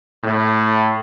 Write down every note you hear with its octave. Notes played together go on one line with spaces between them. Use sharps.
A2